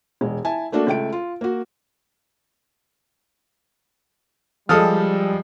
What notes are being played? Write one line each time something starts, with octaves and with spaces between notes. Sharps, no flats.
E1 G#3
E4 G#5 A5
A3 A#3 D4 F#4 A4
C#2 A3 G5 D7
F4
A#3 F#4
F3 G3 G#3 A4 D#6 F6